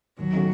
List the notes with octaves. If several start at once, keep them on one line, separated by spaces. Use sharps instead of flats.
D#2 F#3
D#3 A3 C#4 F#4